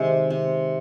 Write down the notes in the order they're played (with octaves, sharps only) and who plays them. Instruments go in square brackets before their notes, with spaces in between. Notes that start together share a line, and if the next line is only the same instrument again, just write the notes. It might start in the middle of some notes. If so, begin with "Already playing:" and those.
Already playing: [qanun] C3 D#3 G#3
C3